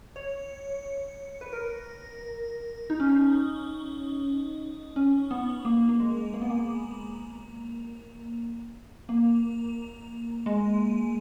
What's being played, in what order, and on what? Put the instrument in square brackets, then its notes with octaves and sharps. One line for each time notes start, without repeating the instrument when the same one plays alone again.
[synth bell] C#5
B4
A#4
D#4
C#4
D#4
C#4
B3
A#3
A#3
G#3
A#3
B3
A#3
A#3
G#3